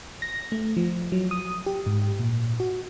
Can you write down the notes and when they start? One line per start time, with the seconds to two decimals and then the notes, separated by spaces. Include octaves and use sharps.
0.22 A#6
0.52 A3
0.77 F3
1.12 F#3
1.31 D#6
1.66 G4
1.86 G#2
2.19 A#2
2.60 F#4